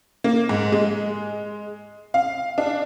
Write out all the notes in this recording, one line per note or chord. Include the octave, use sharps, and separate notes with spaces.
A#3
G#2
G#3
F5
D4